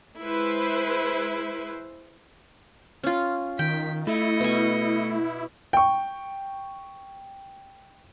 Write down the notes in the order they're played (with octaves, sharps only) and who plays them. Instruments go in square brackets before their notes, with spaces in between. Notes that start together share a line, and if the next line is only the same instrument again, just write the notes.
[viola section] G#3 E4 B4 C5
[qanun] C#4 F4
[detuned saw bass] D#3 [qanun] G5 [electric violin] B6
[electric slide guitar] A3 [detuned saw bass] E4 [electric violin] D#5 C#7
[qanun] B2 G#5
[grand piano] G5 C#6